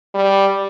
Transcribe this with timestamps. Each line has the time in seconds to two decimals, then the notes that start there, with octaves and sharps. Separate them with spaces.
0.15 G3